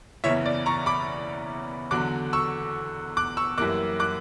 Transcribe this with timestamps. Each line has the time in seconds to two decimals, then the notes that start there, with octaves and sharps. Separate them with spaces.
0.24 F#1 E2 C#3 E3 C#5 E5
0.46 D5
0.66 A#5 C#6
0.86 B5 D6
1.91 E2 D3 F#3 D6 F#6
2.33 C#6 E6
3.17 D6 F#6
3.37 C#6 E6
3.58 F#2 E3 G3 A#3 D6 F#6
4.00 D6 F#6